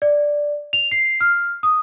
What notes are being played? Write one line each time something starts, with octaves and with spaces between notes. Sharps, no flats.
D5
F7
C7
F6
D#6